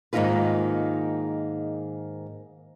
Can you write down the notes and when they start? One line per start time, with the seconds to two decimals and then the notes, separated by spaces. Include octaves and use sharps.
0.13 G#2 D#3 A#3 D#4 F4 B4